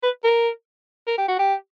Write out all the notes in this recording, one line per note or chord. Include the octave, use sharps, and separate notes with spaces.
B4
A#4
A#4
G4
F#4
G4